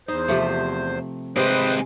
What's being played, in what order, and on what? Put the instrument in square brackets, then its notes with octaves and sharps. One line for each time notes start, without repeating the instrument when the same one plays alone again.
[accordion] E2 C5 [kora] D#4
[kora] C3 F3 A3
[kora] C3 [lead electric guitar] G#3 C4 [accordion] B4 C5 D#6